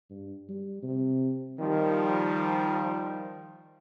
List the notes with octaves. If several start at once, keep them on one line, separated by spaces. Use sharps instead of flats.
G2
G3
C3
D#3 F3 G3